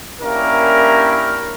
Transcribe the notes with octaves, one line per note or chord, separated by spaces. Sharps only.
A#3 C#4 D4 E4 G4 A#4